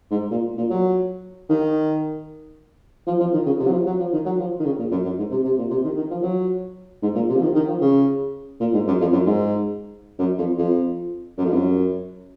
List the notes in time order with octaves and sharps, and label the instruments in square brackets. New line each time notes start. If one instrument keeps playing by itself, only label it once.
[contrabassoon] G#2
A#2
A#2
F#3
D#3
F3
F3
D#3
C#3
C3
F#3
F3
F#3
F3
D#3
F#3
F3
D#3
C#3
A#2
F#2
F#2
G#2
C3
C3
A#2
C3
D#3
D#3
F3
F#3
G#2
A#2
C3
F3
D#3
D#3
F3
C#3
A#2
G#2
F#2
F2
F#2
G#2
F#2
F2
F2
F#2
F2
F#2